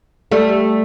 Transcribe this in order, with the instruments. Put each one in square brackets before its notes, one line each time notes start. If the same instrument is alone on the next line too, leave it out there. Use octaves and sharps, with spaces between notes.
[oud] G3 A3